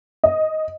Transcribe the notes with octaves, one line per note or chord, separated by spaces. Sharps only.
D#5